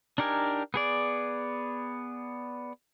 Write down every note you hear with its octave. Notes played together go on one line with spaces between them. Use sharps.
D4 D#4 G4 A#4 G#5
B3 G#4 D5